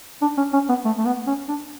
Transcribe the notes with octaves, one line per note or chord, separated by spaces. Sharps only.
D4
C#4
C#4
B3
A3
A3
B3
C#4
D4